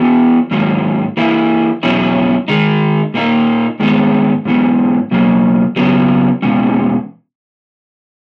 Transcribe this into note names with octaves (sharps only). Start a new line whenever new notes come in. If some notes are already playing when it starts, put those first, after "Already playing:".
Already playing: E3 B3 F#4
G#2 D#3 F#3 A#3
E3 A#3 E4
E2 B2 F#3 C#4 E4
D#3 G#3 D#4
A#2 A#3 D#4
G#2 D#3 G#3 B3 D#4
G#2 E3 B3
B2 F#3 A#3
C#3 F#3 B3
E2 B2 G#3 C#4